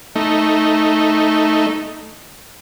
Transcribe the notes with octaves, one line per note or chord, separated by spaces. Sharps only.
A3 D#4